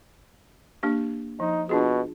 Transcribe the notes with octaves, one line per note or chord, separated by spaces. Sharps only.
A#3 D4 G4
F3 D#4
B2 D4 F4 G#4